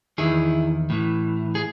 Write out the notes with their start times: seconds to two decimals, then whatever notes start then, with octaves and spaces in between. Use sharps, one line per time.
0.18 E2 D#3 E4 G#4
0.90 A2 E3
1.55 G#4